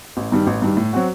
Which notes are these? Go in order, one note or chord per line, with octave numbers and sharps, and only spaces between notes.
A1
G2 D#3 G3
A1
G2 D#3 G3
A2
F#3 C4 F#4